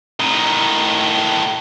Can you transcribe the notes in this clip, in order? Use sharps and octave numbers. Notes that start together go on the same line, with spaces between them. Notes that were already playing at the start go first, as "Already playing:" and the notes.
A2 D#3